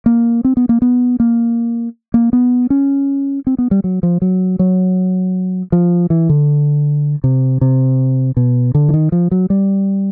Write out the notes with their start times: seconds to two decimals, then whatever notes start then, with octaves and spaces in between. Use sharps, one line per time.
0.06 A#3
0.44 C4
0.57 B3
0.69 A#3
0.82 B3
1.20 A#3
2.14 A#3
2.33 B3
2.70 C#4
3.47 C4
3.58 B3
3.71 G3
3.84 F#3
4.03 F3
4.22 F#3
4.59 F#3
5.72 F3
6.10 E3
6.29 D3
7.24 C3
7.61 C3
8.37 B2
8.75 D3
8.89 E3
8.94 D#3
9.12 F3
9.31 F#3
9.50 G3